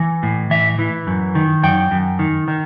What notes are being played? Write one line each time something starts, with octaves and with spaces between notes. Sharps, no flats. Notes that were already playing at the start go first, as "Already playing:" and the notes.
Already playing: E3
A2
E3 E5
E3
F#2
D#3
F#2 G5
F#2
D#3
D#3